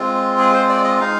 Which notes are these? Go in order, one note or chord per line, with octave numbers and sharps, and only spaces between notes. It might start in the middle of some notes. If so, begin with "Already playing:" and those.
Already playing: G#3 C4 F4
G#4
C5
D5
D#5
G#3 D#4 F5